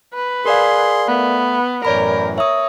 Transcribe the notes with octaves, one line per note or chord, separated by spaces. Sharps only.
B4
G#4 A#4 D5 F5 C6
A3 B3
F#2 A2 E3 A#4 C#5 D5 B5
C#5 E5 D#6